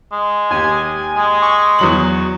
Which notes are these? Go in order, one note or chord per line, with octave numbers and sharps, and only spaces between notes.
G#3
D#2 G4 G#5
G#3
C#6
E2 F#3 F#7